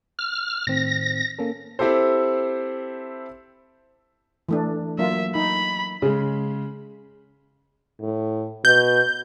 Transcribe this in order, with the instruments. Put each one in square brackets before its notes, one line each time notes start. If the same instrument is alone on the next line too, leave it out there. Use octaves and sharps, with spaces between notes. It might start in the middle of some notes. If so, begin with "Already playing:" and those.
[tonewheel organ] F6
[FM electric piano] A2 D#3 C4 [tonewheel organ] A#6
[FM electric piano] A#3 C#4 A4
[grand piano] C4 E4 G4 A4 C5
[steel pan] E3 A3 D4
[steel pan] F#3 A#3 F4 [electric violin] E5
[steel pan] D#4 [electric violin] B5
[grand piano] C#3 G#3
[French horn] A2
[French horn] B2 [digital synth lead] G6